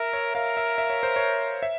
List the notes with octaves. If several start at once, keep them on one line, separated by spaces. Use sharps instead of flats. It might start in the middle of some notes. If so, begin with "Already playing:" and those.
Already playing: A#4 E5
C#5
A#4 F5
E5
E5
C#5
C5
C#5
E5